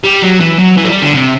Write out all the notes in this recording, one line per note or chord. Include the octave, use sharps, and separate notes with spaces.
G3
F#3
E3
F#3
E3
A3
G3
D3
C3